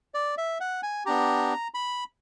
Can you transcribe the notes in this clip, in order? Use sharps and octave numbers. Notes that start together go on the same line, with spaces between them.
D5
E5
F#5
G#5
B3 D4 G4 A#5
B5